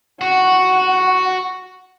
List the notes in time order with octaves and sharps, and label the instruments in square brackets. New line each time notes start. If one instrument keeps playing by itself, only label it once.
[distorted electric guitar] F#4 [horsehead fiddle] F#5